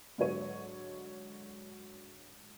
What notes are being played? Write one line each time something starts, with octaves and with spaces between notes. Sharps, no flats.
G#2 D3 F#3 C#5 D#7